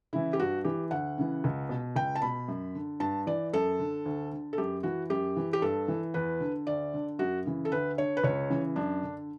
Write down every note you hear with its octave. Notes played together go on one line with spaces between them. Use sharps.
C#3 E3 E4
G4
G2 F#4
E3 G4
D2 F#5
C#3 E3
C#2
B2
C#2 G5
A5
B2 B5
F#2
D3
G2 A5
E3 D5
F#2 A4
D3
D2
D3
A4
F#2 G4
E3 F#4
F#2 G4
E3
G4
G2 A4
E3
E2 B4
D3
D2 D5
D3
F#2 F#4
C#3 E3
A4
D2 B4
D3 C#5
B4
C#2 C#5
C#3 E3
F#2 D4
D3